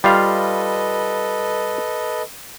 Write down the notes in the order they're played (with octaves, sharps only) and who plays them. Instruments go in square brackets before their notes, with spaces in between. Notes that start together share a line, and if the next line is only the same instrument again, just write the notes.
[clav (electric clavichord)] G3 F4 F5 [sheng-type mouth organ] A4 B4 D#5